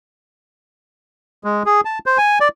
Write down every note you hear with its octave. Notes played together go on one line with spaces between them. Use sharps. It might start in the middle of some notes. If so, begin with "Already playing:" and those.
G#3
G#4
A5
C5
G#5
D5